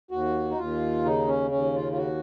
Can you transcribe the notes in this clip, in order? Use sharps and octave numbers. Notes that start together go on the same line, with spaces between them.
D#2 F#4
D#4
D#2 F4
C#3 D#4
C#4
D#2 C#4
F4
F4
F#4